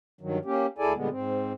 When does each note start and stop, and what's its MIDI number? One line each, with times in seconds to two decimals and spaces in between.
0.21 0.38 43
0.21 0.38 51
0.21 0.38 54
0.45 0.66 58
0.45 0.66 61
0.45 0.66 67
0.78 0.93 38
0.78 0.93 64
0.78 0.93 68
0.78 0.93 69
0.78 0.93 74
0.78 0.93 80
0.95 1.09 46
0.95 1.09 50
0.95 1.09 55
0.95 1.09 56
0.95 1.09 59
1.09 1.53 44
1.09 1.53 60